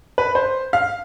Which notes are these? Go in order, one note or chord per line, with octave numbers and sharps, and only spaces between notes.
B4
C5
F5